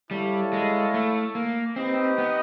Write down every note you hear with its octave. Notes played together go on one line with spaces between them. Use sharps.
G3 E4 A4 C#5 F5
G#3
A3
A#3
C4 D#4 G4 B4 D#5
B3